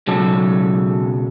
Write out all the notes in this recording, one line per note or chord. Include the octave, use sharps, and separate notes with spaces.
B1 C#3 F#3 G#3 A4